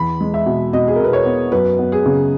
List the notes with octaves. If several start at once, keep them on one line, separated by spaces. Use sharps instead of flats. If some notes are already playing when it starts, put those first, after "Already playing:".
Already playing: E2 B5
G#3
E5
B2
B2 D#5
G#4
A#4
B2 B4
C#5
B3
F#2 B4
B3
G#4
C#3